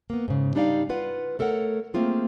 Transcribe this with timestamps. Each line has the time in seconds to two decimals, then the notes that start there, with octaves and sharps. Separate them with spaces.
0.10 A#3 B3
0.28 G#2 C#3
0.55 G3 D4 D#4 D5 E5 F5
0.89 F4 B4 F#5
1.39 A3 A4 A#4 C#5 F#5
1.94 A3 A#3 C4 F4 G#4